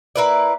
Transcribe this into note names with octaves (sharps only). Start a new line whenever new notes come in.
A#3 E4 B4 D5